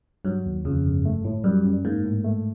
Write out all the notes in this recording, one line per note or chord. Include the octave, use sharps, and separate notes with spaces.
G2 F#3
D#2
F2 C#3
G1
A3
A2
F#2 G3
F#2
G#2 A#3
A2
A3